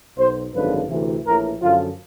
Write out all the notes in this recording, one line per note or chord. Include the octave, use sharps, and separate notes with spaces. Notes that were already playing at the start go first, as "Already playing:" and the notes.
B1 B2 C5
G#1 F#2 D3 F3 B4
D2 C3 E3
A#1 A2 E3 A#4
F#2 D3 F3 F4